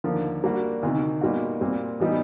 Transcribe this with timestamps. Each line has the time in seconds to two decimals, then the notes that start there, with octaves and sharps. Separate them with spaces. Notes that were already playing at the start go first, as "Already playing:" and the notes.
0.04 D#2 D3 F3 A#3
0.44 G3 A#3 D4 F#4
0.83 D2 C3 D#3
1.21 A#2 G3 B3 D#4 F#4
1.61 A#2 G3 C4
2.00 A2 E3 G3 B3 D#4